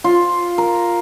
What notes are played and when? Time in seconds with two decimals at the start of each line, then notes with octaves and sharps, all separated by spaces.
0.04 F4
0.58 A#4